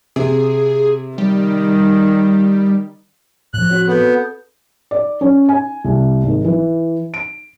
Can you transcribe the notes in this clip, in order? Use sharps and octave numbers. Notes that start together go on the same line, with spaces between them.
C3 G#4
D#3 G3
A2 F3 F#6
C4 F#4 C#5
B3 A4 G6
D5
C#4
G#5
C2
G#1
E3
D7